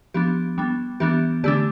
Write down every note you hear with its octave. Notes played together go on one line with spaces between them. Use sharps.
F3 B3 D4 G4
G3 B3 D4
E3 B3 D4 G4
D3 A3 D4 G4